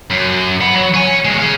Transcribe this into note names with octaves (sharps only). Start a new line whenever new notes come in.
F#2
F#5 B5
F#3
C#5 G#5
E2 G#3
G#4 F5